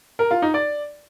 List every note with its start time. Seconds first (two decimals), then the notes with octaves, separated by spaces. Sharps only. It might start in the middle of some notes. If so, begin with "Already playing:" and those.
0.19 A#4
0.31 F4
0.42 D#4
0.54 D5